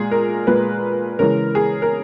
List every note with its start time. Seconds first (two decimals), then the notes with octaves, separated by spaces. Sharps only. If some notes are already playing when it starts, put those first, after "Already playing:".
Already playing: A#2 G#3 G#4
0.11 A#4
0.47 A#2 G#3 B4
1.19 C#3 E3 G#3 A#4
1.55 G#4
1.82 A#4